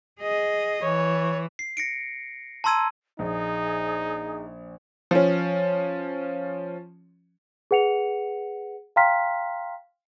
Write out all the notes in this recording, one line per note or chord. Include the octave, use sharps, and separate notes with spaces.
G#4 D#5
E3 C#5
C7
A#6 C#7 D7
A5 A#5 C6 E6 G#6 D#7
A#1 D#4 G#4
F3 C#4
G#4 B4 F#5 C#7 F7
F5 G5 A#5 C6 F6 B6